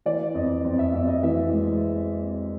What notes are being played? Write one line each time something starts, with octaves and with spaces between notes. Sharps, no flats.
E3 D5
F2 D#5
F2
E5
F2 E5
D#5
E3 E5
G#3